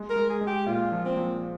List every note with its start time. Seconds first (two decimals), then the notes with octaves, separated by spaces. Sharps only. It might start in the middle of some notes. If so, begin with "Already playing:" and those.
Already playing: G#3
0.10 A#4
0.16 G#3
0.29 G#4
0.41 G#3
0.47 G4
0.66 A#2 F4
0.92 F3
1.05 C4
1.17 F3